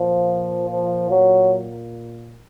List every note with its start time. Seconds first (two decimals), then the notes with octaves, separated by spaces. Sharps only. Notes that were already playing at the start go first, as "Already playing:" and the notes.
Already playing: A#2 F3
0.68 F3
1.10 F#3